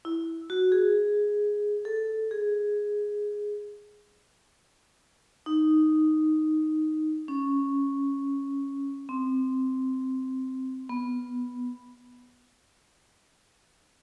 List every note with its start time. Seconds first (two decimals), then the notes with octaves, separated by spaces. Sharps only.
0.05 E4
0.50 F#4
0.72 G#4
1.85 A4
2.31 G#4
5.46 D#4
7.28 C#4
9.09 C4
10.89 B3